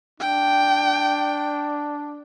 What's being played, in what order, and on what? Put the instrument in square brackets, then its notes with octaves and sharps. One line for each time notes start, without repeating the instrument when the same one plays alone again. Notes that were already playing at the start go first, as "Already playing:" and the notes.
[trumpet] D4 [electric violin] G5